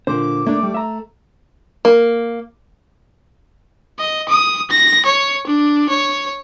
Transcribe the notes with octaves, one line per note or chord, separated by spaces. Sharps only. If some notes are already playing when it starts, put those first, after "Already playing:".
A#2 D3 C5 D6
A3 A#3 D4
G3
E5 A#5
A#3
D#5
D#6
A#6
C#5
D4
C#5